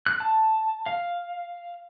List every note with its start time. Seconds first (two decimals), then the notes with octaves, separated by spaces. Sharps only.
0.06 F#6
0.20 A5
0.86 F5